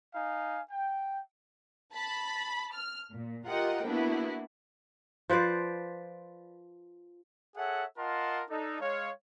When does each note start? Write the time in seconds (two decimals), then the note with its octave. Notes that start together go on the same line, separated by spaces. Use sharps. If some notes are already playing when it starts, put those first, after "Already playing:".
0.15 D#4 F5 G#5
0.71 G5
1.93 A5 B5
2.74 F6
3.11 A#2
3.47 F4 G4 A#4 D#5 F#5 G5
3.85 A#3 B3 D4 E4 F#4
5.30 F3 B4 C5 D5
7.56 G#4 A4 C#5 E5 F#5
7.98 F4 A#4 D#5 F#5 A5 C6
8.49 D4 D#4 A4
8.81 G#3 C#5 F5